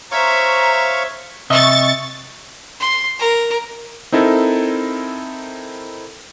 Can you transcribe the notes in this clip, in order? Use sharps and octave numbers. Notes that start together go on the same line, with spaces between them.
C5 C#5 E5 F5 A#5 C#6
C3 D#5 E5 C#6 A6
C6
A#4
C4 D#4 E4 A4 A#4